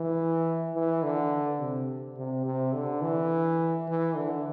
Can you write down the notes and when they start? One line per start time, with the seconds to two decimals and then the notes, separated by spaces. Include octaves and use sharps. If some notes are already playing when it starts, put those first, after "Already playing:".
Already playing: E3
0.74 E3
1.03 D3
1.60 C3
2.17 C3
2.45 C3
2.73 D3
3.02 E3
3.88 E3
4.16 D3